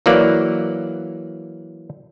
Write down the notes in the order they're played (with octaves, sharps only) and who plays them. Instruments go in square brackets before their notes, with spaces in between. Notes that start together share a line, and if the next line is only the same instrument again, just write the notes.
[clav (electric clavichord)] E3 F#3 A#3 D5